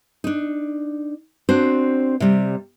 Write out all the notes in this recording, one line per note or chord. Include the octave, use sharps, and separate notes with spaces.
D4 D#4
C4 D4 F#4 C5
C3 G3